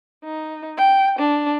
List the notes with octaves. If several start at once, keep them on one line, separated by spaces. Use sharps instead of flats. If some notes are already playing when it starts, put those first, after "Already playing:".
D#4
G5
D4